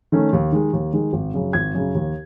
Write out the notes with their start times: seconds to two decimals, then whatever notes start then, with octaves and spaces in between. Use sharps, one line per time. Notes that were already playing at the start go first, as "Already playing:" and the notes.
0.12 D#3 A3 C#4
0.33 D#2
0.52 D#3 G#3
0.73 D#2
0.93 D#3 G#3
1.13 G#1
1.34 F#2 C#3
1.53 G#1 G#6
1.74 F#2 C#3
1.95 D#2